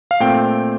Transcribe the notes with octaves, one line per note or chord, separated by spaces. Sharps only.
F5
A#2 A3 C4 G5